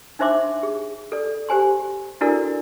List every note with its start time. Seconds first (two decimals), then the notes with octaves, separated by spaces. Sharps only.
0.19 D4 D#4 C5 E5 C6 D6
0.63 G#4
1.12 A4 D5
1.49 G4 C5 G#5 C6
2.21 D4 E4 F#4 A4 A#4 D5